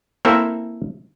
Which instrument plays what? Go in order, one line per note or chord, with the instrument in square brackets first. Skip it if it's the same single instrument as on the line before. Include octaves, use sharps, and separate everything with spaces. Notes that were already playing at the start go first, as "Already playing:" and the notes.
[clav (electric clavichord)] A#3 C4 E4 A4 C5 E5